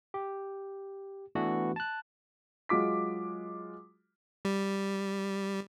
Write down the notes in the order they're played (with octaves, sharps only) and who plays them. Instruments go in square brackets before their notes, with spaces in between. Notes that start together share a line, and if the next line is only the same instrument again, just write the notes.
[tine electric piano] G4
E3 A3 B3 D4 F#4
A5 F#6
[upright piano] F#3 G#3 F4 D6 B6
[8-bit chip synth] G3